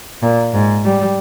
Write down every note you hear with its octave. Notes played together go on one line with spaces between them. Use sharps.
A#2
G#2
G3